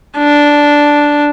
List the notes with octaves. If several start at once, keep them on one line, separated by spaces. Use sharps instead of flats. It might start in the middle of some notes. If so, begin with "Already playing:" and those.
D4